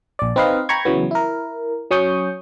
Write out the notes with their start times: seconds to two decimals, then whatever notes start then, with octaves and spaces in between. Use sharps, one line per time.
0.19 A#1 D5
0.36 C4 D#4 B4 D#5 F5
0.69 G5 A#5 B5 C#6 G#6
0.85 C#3 E3 F#3 B3
1.11 E4 A#4
1.91 F#3 C#4 C#6 D#6 G6